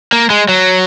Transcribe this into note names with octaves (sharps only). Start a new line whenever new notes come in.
A#3
G#3
F#3